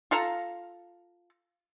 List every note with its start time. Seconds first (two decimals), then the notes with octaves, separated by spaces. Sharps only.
0.11 F4 A4 F5 A#5